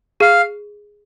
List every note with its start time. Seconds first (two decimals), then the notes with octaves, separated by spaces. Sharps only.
0.20 G#4 F5